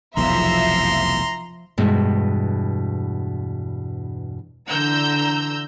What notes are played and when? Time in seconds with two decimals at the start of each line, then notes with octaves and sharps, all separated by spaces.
0.17 F1 B1 E2 F3 E5 A#5 C6
1.78 E2 G2 B2 G#3 B3
4.68 D3 E3 A#5 E6 G6